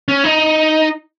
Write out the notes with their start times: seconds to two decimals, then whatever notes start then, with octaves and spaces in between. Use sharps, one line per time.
0.08 C#4
0.24 D#4